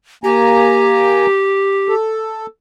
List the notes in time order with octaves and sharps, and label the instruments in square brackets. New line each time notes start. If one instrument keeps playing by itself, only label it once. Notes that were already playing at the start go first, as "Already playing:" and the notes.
[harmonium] A#3 G#5 A#5 [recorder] G4
[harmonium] A4